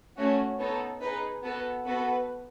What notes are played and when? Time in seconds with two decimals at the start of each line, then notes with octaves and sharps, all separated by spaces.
0.17 A3 C#4 F#4 C#5
0.59 B3 D#4 A4 C#5
1.01 D#4 G#4 B4
1.43 B3 F#4 A4 B4
1.85 B3 F#4 A4 B4